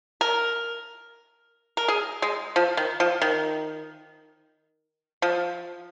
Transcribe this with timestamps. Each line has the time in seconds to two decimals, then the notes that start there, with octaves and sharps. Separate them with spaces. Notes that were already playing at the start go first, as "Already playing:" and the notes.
0.21 A#4
1.77 A#4
1.88 G#4
2.22 G#3
2.56 F3
2.77 D#3
3.00 F3
3.22 D#3
5.22 F3